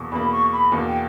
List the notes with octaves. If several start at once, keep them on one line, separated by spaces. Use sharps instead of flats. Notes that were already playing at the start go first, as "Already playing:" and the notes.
Already playing: E2 B2 A#3
E2 B2 A#3 B5
C#6
B5
E2 B2 A#3
G5